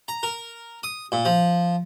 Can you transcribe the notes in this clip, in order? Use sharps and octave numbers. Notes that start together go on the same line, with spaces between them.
A#5
A#4
D#6
A#2
F3